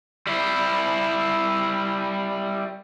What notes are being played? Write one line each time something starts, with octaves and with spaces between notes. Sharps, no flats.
G3 E4